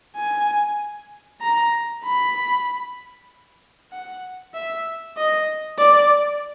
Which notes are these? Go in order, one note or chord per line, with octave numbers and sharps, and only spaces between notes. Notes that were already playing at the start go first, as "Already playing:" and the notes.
G#5
A#5
B5
F#5
E5
D#5
D5